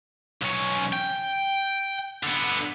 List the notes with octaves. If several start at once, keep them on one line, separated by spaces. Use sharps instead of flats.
B1 C#4
G5
D3 B3